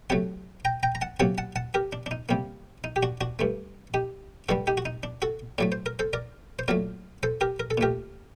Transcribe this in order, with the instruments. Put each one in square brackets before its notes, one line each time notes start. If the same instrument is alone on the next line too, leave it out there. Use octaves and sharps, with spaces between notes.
[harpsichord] C3 F#3 A3 F#5 A5
G5 A#5
G5 A#5
A#5
F#5 A5
C3 F#3 A#3 F#5 A5
F#5 A5
F#5 A5
G4 A#4
D4
D4
D#4
C3 G3 A#3
D#4
G4
D4 F#4
D4 F#4
G2 D3 A3
D#4 G4
G2 D3 G3 F#4 A4
D#4 G4
F#4
D#4
D4
F#4 A4
A2 F#3 A3 D5
C5
A#4
A4 C5
A#4 D5
C5
A#2 F#3 A3 A#4 D5
A4 C5
G4 A#4
A#4
A4
A#2 A3 G4 A#4